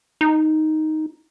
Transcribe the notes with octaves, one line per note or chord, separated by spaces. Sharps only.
D#4